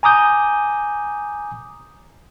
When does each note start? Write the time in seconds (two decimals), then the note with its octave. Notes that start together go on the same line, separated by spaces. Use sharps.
0.03 G#5 A#5 D6 D#6 G6